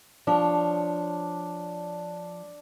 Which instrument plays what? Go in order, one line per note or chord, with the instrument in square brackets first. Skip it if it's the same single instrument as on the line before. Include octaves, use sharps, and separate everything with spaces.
[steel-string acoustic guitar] F3 C#5 [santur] D4